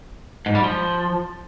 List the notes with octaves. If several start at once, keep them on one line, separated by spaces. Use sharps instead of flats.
G#2
G3
F3